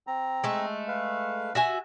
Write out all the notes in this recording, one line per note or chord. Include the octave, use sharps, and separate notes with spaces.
C4 A#5
G#3 A3
B4 F5
F#4 E5 G#5